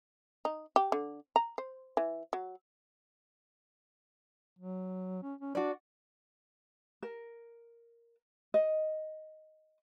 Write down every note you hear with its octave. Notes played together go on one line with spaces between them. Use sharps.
D#4
G4
D3
A#5
C5
E3
F#3
F#3
C#4
C#4
D4 F#4 D5
A#4
D#5